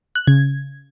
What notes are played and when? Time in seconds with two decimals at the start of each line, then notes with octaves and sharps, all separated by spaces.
0.15 F#6
0.27 C#3 G#6